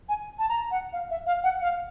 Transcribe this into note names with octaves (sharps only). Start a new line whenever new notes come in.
G#5
A5
A#5
F#5
F5
E5
F5
F#5
F5